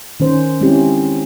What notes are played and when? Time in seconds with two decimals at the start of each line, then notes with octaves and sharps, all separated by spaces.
0.20 D#3 C#4 C5
0.61 G#3 C4 C#4 E4 G4